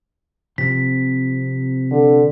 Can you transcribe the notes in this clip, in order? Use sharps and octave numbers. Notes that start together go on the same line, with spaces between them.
C3 F3 C4 B6
D3